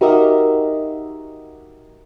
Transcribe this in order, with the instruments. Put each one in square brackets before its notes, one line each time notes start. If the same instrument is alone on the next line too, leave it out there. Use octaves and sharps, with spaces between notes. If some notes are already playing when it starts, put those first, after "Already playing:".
[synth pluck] D#4 F#4 G4 A#4 D#5 E5